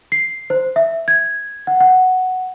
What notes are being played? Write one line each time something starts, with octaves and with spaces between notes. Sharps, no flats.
C7
C5
E5
G#6
F#5
F#5